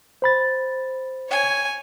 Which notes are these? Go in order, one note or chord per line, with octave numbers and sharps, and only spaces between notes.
C5 B5 A6
C#5 G#5